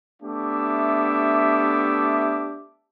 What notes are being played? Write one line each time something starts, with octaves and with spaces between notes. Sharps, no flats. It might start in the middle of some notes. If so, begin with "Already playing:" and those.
A3 B3 D4 G4 E5 D6